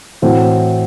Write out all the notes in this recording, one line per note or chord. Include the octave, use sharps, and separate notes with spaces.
A2 E3 A3 C4 F#4